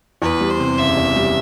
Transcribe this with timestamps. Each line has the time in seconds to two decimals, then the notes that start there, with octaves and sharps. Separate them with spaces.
0.22 E2 B4
0.41 G3
0.50 C5
0.59 C3
0.78 F#1 E5
0.97 E2
1.16 G3